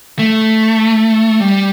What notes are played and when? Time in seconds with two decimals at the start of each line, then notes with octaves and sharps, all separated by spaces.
0.19 A3
1.40 G3